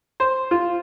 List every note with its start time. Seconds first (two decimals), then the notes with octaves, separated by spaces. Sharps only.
0.20 C5
0.51 F4